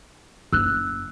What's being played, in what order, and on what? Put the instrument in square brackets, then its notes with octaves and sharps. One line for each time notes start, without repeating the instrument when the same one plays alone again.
[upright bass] F#1 [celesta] E6 F#6